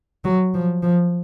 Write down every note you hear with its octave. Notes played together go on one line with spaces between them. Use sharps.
F#3
F3
F3